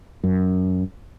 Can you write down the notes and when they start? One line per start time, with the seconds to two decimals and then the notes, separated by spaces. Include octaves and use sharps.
0.24 F#2